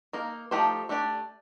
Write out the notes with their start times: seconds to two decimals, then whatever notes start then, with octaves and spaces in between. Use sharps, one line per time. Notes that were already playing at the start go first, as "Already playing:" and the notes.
0.13 A#3 D#4 A#4
0.51 F3 A3 D#4 G4 C5
0.89 A3 D4 G4 D5